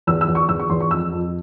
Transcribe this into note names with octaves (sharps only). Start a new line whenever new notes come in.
E2 E6
E6
E2
C#6
E2 E6
C#6
E2 C6
C#6
F2 E6
F2